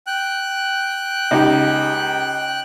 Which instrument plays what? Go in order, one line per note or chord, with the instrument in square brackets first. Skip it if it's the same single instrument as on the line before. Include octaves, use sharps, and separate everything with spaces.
[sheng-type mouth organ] G5 F#6
[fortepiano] C#2 D#4 G4